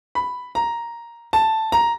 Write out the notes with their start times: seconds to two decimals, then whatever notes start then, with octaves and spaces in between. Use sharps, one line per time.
0.15 B5
0.55 A#5
1.33 A5
1.72 A#5